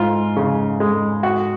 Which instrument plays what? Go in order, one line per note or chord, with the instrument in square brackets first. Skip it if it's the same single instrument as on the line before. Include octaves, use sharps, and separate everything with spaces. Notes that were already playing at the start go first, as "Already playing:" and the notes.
Already playing: [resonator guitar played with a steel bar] G#2 [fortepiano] F4
[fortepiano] C#3
G#3
F#4